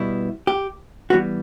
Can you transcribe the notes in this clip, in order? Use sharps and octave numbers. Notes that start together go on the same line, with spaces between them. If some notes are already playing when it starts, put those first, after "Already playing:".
Already playing: B2 G3 B3 E4
G4
E3 G3 B3 F#4